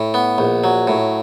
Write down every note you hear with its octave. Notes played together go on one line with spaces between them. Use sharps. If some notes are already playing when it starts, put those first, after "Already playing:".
Already playing: A2
B3
A#1
F#3
A2